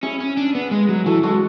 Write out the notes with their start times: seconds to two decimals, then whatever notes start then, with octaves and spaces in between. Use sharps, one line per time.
0.03 C#4 E4 G#4
0.20 C#4
0.37 D4
0.55 B3
0.71 G#3
0.89 F#3
1.06 E3 F#4 A4
1.23 G#3 F#4 A4